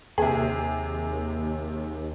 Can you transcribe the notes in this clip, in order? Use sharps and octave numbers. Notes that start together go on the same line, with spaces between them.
D#2 C3 G#4